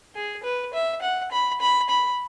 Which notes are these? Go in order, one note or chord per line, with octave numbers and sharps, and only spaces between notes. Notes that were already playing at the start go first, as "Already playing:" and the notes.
G#4
B4
E5
F#5
B5
B5
B5